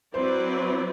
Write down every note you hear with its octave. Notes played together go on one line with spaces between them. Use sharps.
F#3 C4 E4 B4 C5 D5